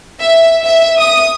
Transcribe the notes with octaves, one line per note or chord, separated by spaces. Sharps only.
E5
E5
D#6